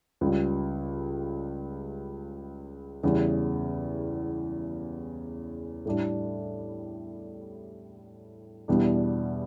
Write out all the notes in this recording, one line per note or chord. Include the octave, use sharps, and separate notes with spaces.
C#2 C#3 G3
E2 C#3 G3
A2 G3 D4
E2 B2 G3 D4